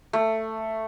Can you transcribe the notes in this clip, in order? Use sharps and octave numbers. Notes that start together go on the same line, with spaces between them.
A3